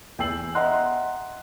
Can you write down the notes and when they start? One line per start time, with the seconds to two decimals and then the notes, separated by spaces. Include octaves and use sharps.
0.19 E2 G5 G#5 E6 C7 F#7
0.55 D#5 E5 F#5 A#5 C6 F#6